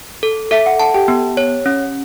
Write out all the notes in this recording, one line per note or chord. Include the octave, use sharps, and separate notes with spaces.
A4
A4 E5
F#5
F#5 A5
G4 G5
B3
C#5
C#4